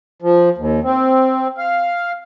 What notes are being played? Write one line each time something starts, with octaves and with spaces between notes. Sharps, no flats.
F3
D#2
C4
F5